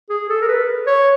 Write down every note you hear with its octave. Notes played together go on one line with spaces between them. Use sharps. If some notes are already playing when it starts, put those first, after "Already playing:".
G#4
A4
A#4
B4
C#5